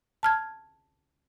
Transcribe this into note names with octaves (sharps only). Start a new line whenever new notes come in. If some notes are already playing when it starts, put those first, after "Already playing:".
A5 F6 G#6